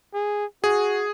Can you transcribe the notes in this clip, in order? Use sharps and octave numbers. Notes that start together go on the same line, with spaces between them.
G#4
F#4 G#4